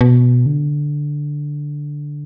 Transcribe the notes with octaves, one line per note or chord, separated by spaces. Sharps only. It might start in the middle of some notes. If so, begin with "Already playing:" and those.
B2
D3